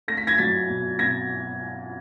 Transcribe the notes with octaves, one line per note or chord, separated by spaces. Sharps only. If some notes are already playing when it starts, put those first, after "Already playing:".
A3 A#6
B6
G#6 A#6
F#3 A6 B6
B2
B2 G#6 A#6